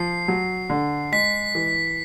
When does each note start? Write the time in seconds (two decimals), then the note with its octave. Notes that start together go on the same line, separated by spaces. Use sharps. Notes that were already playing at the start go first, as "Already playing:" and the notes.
Already playing: F3 C7
0.28 F#3
0.70 D3
1.12 G#3 B6
1.55 E3